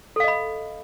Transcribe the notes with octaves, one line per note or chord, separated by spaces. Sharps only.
A4 D#5 F5 B5